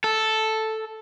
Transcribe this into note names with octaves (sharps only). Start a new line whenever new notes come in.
A4